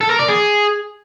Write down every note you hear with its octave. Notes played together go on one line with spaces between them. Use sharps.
A4
A#4
D5
G#4